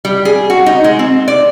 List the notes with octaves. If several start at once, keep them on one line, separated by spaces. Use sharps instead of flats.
G3
G#4
F#4
D#4
G#3
C4
D5